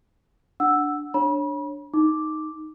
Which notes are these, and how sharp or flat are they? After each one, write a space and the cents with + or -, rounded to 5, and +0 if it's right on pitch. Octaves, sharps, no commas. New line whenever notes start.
D4 +0 F#5 +0 E6 +0
D4 +0 C#5 -15 B5 -35
D#4 +0 D6 +0